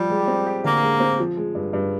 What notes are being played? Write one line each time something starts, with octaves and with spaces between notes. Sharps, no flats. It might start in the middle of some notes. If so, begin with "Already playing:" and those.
Already playing: F3 G3
G#3
C4
G4
D3 A#3
G#3
C4
F3
G#3
G2
G2